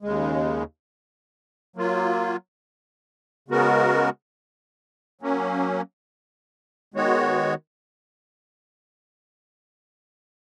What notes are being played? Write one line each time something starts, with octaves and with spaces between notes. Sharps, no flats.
D#2 C#3 G#3
F#3 A#3 F4
C#3 G#3 B3 F#4 A#4
F#3 A#3 C#4
D#3 G#3 B3 F#4 C#5